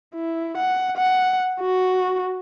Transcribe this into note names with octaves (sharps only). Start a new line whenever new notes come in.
E4
F#5
F#5
F#4